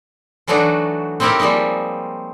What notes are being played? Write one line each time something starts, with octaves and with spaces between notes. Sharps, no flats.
E3 F#3 A3 D4 D#4 F#4
C4 D#4 E4 G4 A#4 C#5
F3 G3 G#3 A#3 D#4